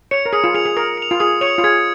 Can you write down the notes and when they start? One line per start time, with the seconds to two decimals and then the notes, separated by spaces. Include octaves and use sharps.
0.11 C#5 C#7 F7
0.26 A#4
0.33 G#4 D#6
0.44 F4
0.55 G#4 C#7 F7
0.65 G#4
0.77 A#4 D#6
0.98 C#7 F7
1.11 F4
1.20 G#4 D#6
1.41 C#5 C#7 F7
1.58 F4
1.64 G#4 G#6